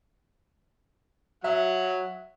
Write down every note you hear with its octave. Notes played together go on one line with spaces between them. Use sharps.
F#3 E5 F#5